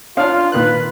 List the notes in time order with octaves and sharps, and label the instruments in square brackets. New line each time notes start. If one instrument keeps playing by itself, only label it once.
[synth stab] C#4 D4 [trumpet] F4 [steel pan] F5
[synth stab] A#2 D#3 F#6 [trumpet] B4